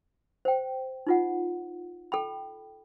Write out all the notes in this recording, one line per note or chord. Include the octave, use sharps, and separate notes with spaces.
C5 G5
D#4 F4 F#5
A4 G5 B5